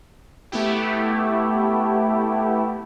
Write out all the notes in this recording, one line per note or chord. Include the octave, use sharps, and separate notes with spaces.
A3 B3 E4 G4